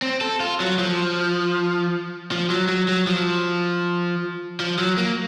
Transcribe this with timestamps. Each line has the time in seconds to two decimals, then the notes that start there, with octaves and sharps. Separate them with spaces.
0.02 C4
0.21 A4
0.40 F4
0.60 F#3
0.79 F3
2.32 F3
2.50 F#3
2.69 F#3
2.88 F#3
3.07 F3
4.60 F3
4.78 F#3
4.98 A#3